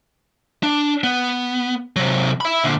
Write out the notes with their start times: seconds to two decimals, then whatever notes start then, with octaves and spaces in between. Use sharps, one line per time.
0.63 D4
1.04 B3
1.96 C3 F#3
2.41 E5 B5
2.64 A#2 D3